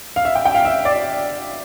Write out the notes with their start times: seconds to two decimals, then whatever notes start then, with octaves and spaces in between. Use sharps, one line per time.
0.16 F5
0.25 E5
0.35 G5
0.45 G5
0.55 F5
0.65 E5
0.85 D5